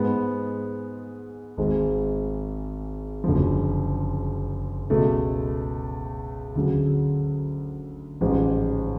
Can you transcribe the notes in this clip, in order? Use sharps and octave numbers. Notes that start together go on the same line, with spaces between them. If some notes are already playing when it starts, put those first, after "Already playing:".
Already playing: G#2 G#3 B3
G#1 G#2 G#3
F#1 F#2 D3 F3
C#2 B2 A3
D2 C#3 F#3
A1 G#2 F3